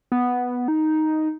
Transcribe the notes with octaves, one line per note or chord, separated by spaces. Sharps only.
B3
D#4